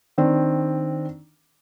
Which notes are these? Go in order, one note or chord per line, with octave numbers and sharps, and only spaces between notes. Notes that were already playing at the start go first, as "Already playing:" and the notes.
D#3 C4 D4